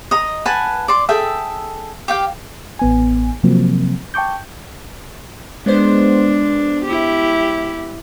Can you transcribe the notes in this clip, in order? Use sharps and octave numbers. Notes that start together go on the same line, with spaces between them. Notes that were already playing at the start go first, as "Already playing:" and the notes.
D#5 A#5
B4 F#5 G#5 A5
D5 C6
G#4 A4 E5 G5
G4 F5 G5
A1 B3 G#5
C3 F3 F#3 A#3 C4
G5 A5 C#6 D6 G6
G#3 B3 D4 C5
E4 G4